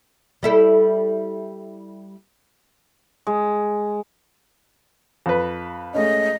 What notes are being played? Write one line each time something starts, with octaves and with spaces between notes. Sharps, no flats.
G3 E4 A4
G#3
F2 B4
G#3 A3 C#4 D#5